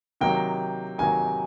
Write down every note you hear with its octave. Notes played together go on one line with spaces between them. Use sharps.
C3 D#3 F#3 A#3 D#4 G5
C3 D#3 F#3 A#3 D#4 G#5